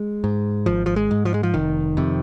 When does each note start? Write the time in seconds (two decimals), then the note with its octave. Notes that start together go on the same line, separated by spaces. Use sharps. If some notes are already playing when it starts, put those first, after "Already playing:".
Already playing: G#3
0.24 G#2
0.66 G#1 F3
0.86 F3
0.96 G#3
1.11 G#2
1.25 F3
1.34 G#3
1.43 F3
1.54 F1 D#3
1.97 F2 C3